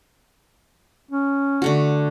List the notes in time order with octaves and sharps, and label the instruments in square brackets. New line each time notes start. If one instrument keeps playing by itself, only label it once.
[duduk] C#4
[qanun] D3 A3 F#4